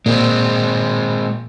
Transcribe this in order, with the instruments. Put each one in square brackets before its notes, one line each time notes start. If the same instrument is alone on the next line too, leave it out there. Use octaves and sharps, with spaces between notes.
[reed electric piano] A#2 [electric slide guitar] G#3 C4